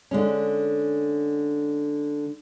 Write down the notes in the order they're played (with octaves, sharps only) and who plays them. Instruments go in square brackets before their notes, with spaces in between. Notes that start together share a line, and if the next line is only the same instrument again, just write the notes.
[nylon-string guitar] D3 G#3 C#4